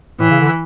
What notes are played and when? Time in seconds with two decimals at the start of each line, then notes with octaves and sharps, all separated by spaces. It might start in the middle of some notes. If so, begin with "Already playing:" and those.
0.20 A2 E3
0.30 C#3
0.41 D3